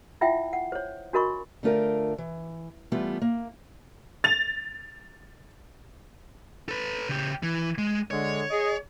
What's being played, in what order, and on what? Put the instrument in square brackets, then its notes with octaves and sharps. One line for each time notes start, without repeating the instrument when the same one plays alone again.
[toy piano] E4 F4 E5 F#5 G5
F#5
C5 C#5
D4 F#4 A#4 D#5 B5 C#6
[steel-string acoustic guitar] D3 A3 F4 A#4 G5
E3
E3 G3 A3 B3 F4
A#3
[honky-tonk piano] A6 F7
[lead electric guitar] A4 B4
C#3 G4
E3
G#3
[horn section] D3 G#3 [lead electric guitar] C#5
[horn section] G#4 D#5